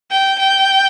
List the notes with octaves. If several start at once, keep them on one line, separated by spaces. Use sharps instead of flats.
G5
G5